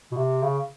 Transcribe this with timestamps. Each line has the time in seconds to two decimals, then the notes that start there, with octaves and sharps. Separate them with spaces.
0.12 B2
0.17 C3
0.42 C#3